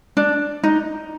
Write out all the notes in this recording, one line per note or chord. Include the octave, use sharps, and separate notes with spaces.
D4
D#4